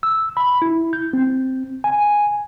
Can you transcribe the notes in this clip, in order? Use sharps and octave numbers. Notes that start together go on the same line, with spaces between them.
E6
B5
E4
G6
C4
G#5